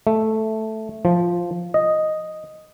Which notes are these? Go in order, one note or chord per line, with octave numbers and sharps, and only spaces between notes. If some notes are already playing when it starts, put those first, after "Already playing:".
A3
F3
D#5